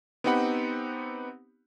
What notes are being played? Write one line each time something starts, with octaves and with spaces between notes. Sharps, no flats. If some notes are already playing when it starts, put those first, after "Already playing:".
B3 C4 D#4 G4 F#5 B5